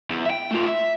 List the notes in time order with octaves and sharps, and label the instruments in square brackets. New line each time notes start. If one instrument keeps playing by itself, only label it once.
[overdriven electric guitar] E2
E5 G5
A3 F4
E5